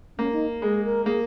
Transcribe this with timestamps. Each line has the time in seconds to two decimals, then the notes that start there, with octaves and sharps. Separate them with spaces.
0.18 A#3 C#4
0.33 D#4
0.62 G#3 G#4
0.85 A#4
1.06 A#3 G#4